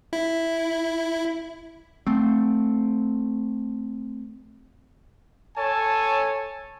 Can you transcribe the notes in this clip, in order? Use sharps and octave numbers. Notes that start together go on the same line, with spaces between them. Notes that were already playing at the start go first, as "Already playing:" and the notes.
E4
A3 C4
A4 C#5 G#5 A5